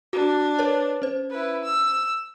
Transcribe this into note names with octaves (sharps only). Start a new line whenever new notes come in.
D4 F#4
A#4 B4 C#5
C#4 C5
E4 B4
E6